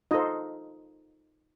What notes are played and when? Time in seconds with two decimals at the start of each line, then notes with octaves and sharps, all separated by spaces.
0.11 D#4 F4 A4 C5 D#5